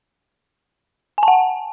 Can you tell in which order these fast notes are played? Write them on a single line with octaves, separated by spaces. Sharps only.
G#5 A5 F#5